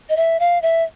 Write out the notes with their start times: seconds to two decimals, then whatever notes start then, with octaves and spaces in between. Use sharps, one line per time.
0.09 D#5
0.17 E5
0.40 F5
0.62 E5